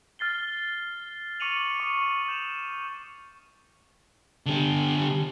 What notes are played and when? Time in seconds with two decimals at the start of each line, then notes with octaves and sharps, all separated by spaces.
0.19 F6 A6 C7 G7
1.40 C#6 D6 C#7 D#7 F7 F#7
1.80 C#6 D#6
2.28 G6 E7 F7
4.46 D3 G4